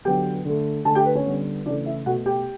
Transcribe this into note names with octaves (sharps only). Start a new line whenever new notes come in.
D3 F#3 B3 G4 G5
D3 A3
D3 A3 A4 A5
G4 G5
B4
C#4 C#5
D3 G3 B3
C#3 E3 A3 D4 D5
E4 E5
B2 A3 F#4 F#5
G4 G5